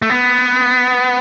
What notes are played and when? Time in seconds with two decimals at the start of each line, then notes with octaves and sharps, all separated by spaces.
0.02 A3
0.10 B3